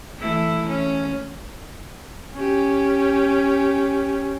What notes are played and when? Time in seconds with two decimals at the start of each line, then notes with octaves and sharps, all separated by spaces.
0.19 E3 A3 E4
0.69 C#4
2.34 C#4 G4